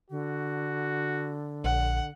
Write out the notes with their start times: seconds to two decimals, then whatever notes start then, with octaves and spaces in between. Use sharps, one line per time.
0.10 D3 F#4
1.64 A#1 F#5